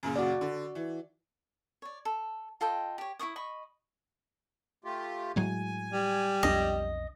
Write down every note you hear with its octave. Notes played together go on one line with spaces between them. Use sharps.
F#2 A#2 C#3
F#4 D5
D3
E3
C#5 D5
A4
F4 A4 D#5 G5
G4 C#5
E4 C5 C#6 D#6
D#5 B5 C#6
A3 F4 G4
A2 F#3 G#3 G#5
G3
B1 F2 D4 D#5